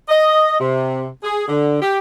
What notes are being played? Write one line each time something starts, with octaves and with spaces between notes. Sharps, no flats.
D#5
C3
G#4
D3
G4